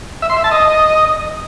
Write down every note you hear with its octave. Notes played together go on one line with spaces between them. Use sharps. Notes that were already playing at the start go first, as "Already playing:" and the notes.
E5
C6
E5
A5
D#5